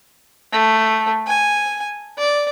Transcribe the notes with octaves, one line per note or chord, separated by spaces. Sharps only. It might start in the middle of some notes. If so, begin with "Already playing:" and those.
A3
G#5
D5